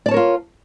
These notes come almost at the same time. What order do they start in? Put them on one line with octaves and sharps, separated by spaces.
D5 A5 C#5 A#4 F4